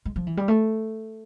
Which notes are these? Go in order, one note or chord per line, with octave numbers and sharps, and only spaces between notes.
G#3
F3
E3
G3
A3